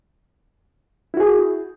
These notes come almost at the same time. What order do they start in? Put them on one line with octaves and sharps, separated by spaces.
E4 F#4 G#4